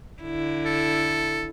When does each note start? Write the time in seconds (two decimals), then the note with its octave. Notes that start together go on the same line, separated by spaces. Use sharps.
0.23 D3 E4
0.65 A4